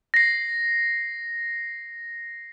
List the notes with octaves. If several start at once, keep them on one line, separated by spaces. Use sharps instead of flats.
A#6 C7